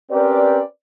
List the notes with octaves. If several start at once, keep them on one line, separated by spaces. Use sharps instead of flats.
C4 C#4 G4 A#4 B4 D5